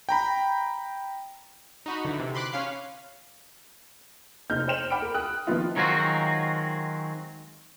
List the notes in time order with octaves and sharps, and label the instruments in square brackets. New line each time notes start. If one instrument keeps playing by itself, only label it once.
[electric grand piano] G5 A#5 B5
[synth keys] D#4 F#4 B5
D3 E3
C3
B5 C6 D6 F#6 B6
C#4 F5 C7
[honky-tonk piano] F1 C4 D#4 F6 G6
C5 G5 E7 F#7
F#5 G5 B5 D6 F6 D7
A#4
G5 D#6 F#6
D#3 F3 B3 C4 E4 F4
[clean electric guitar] D#3 F#3 G#3 C4 F4 F#4